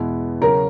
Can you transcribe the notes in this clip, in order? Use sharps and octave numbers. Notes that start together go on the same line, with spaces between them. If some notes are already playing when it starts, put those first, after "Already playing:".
Already playing: E2 B2 G#3 B3 E4
C#3 F#3 C#4 A#4